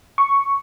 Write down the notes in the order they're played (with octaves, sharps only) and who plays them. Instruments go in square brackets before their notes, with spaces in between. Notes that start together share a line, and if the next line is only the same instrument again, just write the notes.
[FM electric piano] C#6